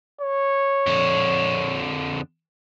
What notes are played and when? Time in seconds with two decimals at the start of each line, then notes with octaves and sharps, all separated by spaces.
0.21 C#5
0.87 F2 D3